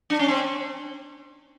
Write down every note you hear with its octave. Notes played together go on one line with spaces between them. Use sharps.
D4
C#4
C4